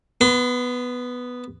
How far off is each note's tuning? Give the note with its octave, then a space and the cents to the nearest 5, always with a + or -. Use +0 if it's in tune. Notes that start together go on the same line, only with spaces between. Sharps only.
B3 +0 C6 -45